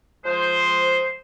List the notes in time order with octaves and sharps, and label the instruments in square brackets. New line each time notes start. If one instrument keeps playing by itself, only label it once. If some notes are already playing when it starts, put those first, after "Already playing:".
[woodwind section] F3 G#3 C5